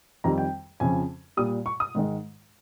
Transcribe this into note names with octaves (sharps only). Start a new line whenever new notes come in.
F2 D#3 G3 A#5
G5
F2 C#3 F3 G#5
A#2 G3 D#6
C#6
D#6
G#2 D#3 G#3